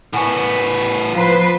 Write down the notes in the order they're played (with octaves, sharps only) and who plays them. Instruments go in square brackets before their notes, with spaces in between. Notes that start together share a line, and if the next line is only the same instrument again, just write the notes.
[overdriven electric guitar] A2 B3 [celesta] F#5 G#5 C#6
[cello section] F3 B4 C5 [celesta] F4 F5 A#5